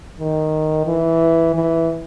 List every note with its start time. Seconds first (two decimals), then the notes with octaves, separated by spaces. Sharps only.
0.20 D#3
0.87 E3
1.55 E3